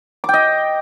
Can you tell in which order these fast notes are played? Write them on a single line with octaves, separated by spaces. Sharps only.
D6 G5 D#5